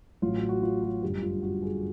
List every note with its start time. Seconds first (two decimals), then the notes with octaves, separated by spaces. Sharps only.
0.22 A1 A2 F#3 F4
0.36 F#4
0.49 F#4
0.62 F4
0.82 F#4
1.02 G1 F#2 D3 G3 G4
1.22 F4
1.42 F#4
1.62 G#4